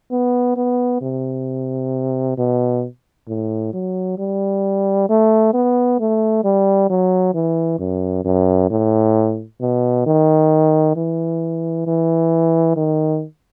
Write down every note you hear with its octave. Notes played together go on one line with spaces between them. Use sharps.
B3
B3
C3
B2
A2
F#3
G3
A3
B3
A3
G3
F#3
E3
F#2
F#2
A2
B2
D#3
E3
E3
D#3